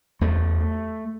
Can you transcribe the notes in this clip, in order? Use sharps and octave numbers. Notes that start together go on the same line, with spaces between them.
E2 A3